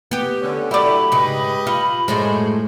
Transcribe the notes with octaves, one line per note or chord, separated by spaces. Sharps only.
B3 G4
D3 C#4
F#3 A3 E4 G4 D5 B5
G#2 C#3 G4 B4 D#5
F4 B5
F#2 A2 G#3 C5 C#5